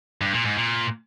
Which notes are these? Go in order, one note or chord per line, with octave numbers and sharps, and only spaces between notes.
G2
A#2
G#2
A#2